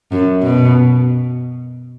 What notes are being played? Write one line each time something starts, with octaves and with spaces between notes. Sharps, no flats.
F#2
B2